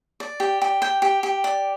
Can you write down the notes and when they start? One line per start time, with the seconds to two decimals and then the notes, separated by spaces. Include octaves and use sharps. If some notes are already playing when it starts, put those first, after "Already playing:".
0.20 D5
0.40 G4
0.62 G4
0.82 G5
1.02 G4
1.23 G4
1.44 D5